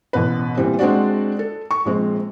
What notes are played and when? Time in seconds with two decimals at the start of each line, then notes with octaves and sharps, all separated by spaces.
0.13 A1 B2 B4
0.57 A#2 E3 G3 C4
0.79 G#3 C4 D4 F#4 D5
1.39 A4
1.71 C#6
1.85 A#1 G#3 C4